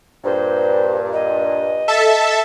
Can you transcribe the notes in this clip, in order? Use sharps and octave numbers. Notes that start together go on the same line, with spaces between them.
G2 A#2 C5
D#5
A4 E5 A5